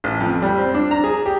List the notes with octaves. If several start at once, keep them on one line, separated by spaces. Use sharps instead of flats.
A1
F2
G3
C4
D4
A#5
G#4
G4